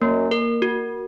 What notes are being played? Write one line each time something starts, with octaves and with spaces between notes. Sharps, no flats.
F#2 A#3
A#4
F#4